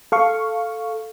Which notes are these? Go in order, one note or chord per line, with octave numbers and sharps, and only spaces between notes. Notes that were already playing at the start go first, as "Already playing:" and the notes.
A4 F5 C#6